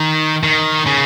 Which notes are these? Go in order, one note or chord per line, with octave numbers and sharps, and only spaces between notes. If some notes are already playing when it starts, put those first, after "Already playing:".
Already playing: D#3
D#3
C#3